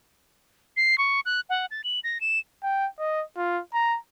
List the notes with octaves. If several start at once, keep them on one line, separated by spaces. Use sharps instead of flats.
C7
C#6
F#6
F#5
A6
F#7
A#6
E7
G5
D#5
F4
A#5